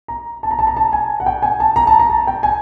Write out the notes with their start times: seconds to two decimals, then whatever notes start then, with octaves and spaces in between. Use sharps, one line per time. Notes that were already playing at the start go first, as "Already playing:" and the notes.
0.08 A#5
0.43 A5
0.51 A#5
0.59 A5
0.67 A#5
0.77 A5
0.93 G#5
1.20 F#5
1.26 G5
1.42 G#5
1.60 A5
1.76 A#5
1.87 A5
1.99 A#5
2.10 A5
2.27 G5
2.43 G#5